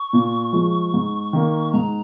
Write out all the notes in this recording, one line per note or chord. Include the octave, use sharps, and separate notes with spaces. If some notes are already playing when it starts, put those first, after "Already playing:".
Already playing: C#6
A#2
F3 G#3
G#2
D#3 A#3
G#2 A#5